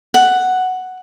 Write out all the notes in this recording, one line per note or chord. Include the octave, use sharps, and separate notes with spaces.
F#5